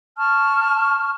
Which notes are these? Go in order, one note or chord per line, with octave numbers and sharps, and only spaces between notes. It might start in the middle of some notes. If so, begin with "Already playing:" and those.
A5 C#6 F6